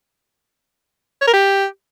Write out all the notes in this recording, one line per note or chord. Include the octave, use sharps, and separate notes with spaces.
C#5
A#4
G4